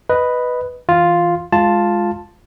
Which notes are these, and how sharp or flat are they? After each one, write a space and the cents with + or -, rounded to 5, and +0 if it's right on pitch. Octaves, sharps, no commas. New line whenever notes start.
B4 +0 D#5 +0
E3 -10 F4 +0
G#3 +0 F4 +0 A5 +0